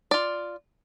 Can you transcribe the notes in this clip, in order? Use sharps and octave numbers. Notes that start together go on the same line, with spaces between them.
F4 D5